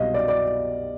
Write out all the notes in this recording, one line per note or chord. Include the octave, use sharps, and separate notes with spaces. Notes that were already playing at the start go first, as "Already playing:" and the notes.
Already playing: C2 B2 F#3 D#5 F5
D5
D5